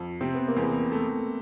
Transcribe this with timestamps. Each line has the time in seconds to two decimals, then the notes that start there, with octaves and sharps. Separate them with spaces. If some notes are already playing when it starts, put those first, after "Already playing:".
Already playing: F2
0.21 C3 C4
0.34 B3
0.48 A#3
0.56 E2 B3
0.92 A3